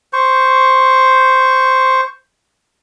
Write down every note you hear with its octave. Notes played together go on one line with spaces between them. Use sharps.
C5 C#6